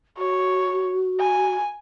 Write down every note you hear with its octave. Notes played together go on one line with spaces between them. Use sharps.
F#4 C#5
G#5